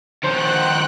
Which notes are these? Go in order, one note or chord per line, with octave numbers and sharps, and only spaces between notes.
D#3 F3 C5 F#5 G5 F#6